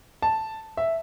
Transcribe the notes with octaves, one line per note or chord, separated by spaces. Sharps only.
A5
E5